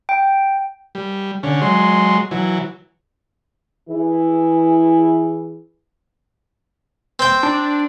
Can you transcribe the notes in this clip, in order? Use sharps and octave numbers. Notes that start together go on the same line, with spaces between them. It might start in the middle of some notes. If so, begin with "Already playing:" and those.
G5
G3
D3 C#4
F#3 G#3 C6
E3 F#3
E3 E4 G#4
C4 G5
D4